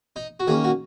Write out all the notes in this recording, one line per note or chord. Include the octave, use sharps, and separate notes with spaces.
D#4
F#4
D#3 A#3 C#4 G#4
F#4